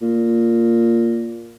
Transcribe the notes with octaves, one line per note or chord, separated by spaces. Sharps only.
A#2